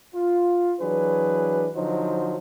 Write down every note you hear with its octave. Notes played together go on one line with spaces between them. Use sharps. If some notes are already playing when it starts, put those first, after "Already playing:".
F4
E3 F#3 D4 G#4 B4
D3 F3 F#3 D#4 C5